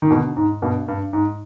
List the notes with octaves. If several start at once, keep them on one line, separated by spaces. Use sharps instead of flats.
D#3
B2 D3
G#2
G2 B2
G2
G#2